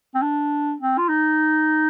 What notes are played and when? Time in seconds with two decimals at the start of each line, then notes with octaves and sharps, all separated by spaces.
0.15 C4
0.22 D4
0.80 C4
0.98 F4
1.09 D#4